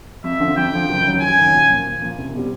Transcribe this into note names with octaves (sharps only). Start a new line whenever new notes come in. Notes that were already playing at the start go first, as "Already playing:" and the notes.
F2 E5
D3 F3
F2 G5
D3 F3
F#1
F#2 D#3 F#3
F#1 G#5
F#2 D#3 F#3
A#2
F3 A#3
A#2
F3 A#3
C2
B2 G3 C4